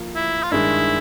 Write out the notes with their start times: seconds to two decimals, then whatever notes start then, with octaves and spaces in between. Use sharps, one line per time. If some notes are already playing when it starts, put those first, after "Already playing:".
Already playing: F3 A#3
0.15 E4
0.43 F4
0.51 G2 D#3 G#3 E4